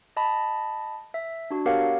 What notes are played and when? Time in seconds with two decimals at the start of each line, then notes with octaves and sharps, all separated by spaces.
0.17 D#5 A5 B5
1.14 E5
1.51 D4 F#4
1.66 B3 G4 A#4 C#5 F5 F#5